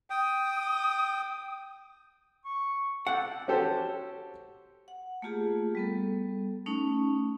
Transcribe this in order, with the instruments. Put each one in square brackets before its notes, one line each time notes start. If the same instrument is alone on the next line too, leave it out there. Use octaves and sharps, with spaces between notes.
[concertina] G5 [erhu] D#6
[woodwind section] C#6
[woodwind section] E4 G4 A4 [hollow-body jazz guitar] F#5
[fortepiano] C#4 F#4 G4 A4 C5
[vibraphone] F#5
A3 A#3 F4 G4 G#4
G3 B3 A4
A3 C#4 D#4